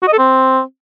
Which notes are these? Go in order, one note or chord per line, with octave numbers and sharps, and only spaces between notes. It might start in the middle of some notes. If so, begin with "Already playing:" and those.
F#4
D#5
A4
C4